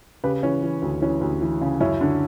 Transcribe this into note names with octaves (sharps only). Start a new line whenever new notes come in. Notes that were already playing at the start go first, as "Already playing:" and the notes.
C#3 G4 B4
E3 C#4
E3
D2
E3 C#4
D2
E3
C#3
F#2 C#4 E4
D3